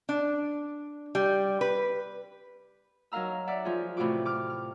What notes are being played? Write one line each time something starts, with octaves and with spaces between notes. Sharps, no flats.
D4
G3
B4
F#3 D#4 A#4 F5 A#5 E6
D5 E5 F#5 D6
F3 F4 G#4
A2 C3 E3 F4 F#4 D6
D6 F6
F6